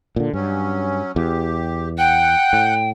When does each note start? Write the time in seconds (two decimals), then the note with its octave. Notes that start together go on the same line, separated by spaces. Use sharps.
0.16 A#2 D3
0.33 G2 F#3 C#4
1.16 E2 G4
1.98 F#5 G5 F#6 G6
2.53 A2